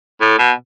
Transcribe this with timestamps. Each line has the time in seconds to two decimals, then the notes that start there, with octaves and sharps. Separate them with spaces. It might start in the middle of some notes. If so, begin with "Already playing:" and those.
0.21 A2
0.39 B2